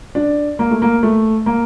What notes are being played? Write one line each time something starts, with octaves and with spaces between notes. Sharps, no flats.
D4
A#3
A3
A#3
A3
A#3